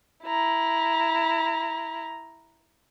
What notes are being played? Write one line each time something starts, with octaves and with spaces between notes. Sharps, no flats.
E4 A#5